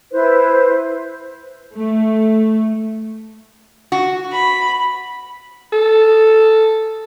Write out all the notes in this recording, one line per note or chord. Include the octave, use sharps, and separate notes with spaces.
E4 B4 C5
A3
F#4
B5
A4